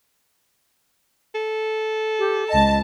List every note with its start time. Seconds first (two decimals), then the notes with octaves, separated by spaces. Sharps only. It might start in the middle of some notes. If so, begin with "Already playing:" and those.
1.35 A4
2.19 G4
2.49 C#2 D#5 A5